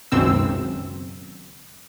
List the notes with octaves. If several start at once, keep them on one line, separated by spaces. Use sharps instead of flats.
G#1 C#2 F#2 B2 C4 E6